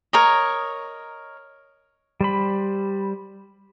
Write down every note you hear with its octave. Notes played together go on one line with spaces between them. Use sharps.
A#4 C#5 D#5
G3 C5 B5